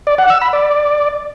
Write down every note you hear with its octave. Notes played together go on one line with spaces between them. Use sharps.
D5
F#5
E6
B5
D5